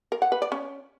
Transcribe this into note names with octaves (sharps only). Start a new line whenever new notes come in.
A#4
F#5
B4
D5
C#4